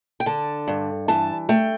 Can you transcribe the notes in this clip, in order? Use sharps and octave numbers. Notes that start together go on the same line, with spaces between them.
G5
D3 A5
G2
E3 A5
A3 G5